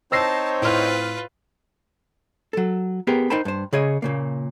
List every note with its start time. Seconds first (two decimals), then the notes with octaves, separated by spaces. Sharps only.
0.12 C4 D#4 C5 C#5 A5 E6 A#6 C7
0.62 A2 F4 B4 F6
2.53 F#3 A4
3.07 B3 G4 G#4 A#4
3.30 D#4 A#4 C5 G5 A5 B5
3.45 G2 C5
3.73 C#3 G#4 C#5 D#5
4.02 A#2 C#3 A#3